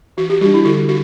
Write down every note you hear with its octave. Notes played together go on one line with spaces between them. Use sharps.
E3 F#4
G4
G3 D4 F#4
E4
D3 F#4
F#4